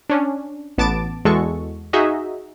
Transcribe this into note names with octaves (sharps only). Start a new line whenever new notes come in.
C#4 D4
A1 B3 A5 D6 A6 D7
E2 G#3 F#4 A4 C#6
D#4 F#4 G#4 D#5 E5